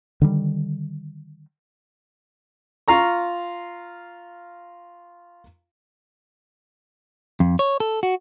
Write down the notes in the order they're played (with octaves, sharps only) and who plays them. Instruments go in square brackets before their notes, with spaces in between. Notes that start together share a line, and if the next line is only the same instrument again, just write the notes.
[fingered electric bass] D3 D#3 G3
[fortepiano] F4 F5 A#5 C#6
[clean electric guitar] F2
C#5
A4
F#4